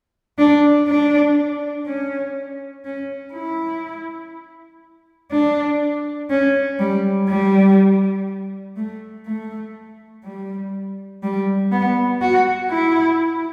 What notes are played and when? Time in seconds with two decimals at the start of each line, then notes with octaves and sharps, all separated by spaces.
0.39 D4
0.88 D4
1.87 C#4
2.85 C#4
3.34 E4
5.31 D4
6.30 C#4
6.79 G3
7.29 G3
8.77 A3
9.26 A3
10.24 G3
11.23 G3
11.72 B3
12.22 F#4
12.70 E4